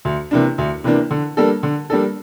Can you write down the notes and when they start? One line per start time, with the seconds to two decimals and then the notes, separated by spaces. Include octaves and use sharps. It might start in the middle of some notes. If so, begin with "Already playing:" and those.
0.05 D2
0.31 C3 E3 A#3 D4
0.58 D2
0.84 C3 E3 A#3 D4
1.11 D3
1.37 G3 A#3 D4 A4
1.63 D3
1.90 G3 A#3 D4 A4